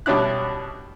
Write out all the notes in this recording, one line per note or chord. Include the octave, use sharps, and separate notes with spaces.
B2 G3 C#4 D4 E4 F#6